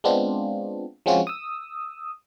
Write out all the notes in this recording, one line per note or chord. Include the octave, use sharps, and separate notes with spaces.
G#3 B3 C4 D4 F4
F3 G#3 C4 C#4 F4 F#4
D#6 E6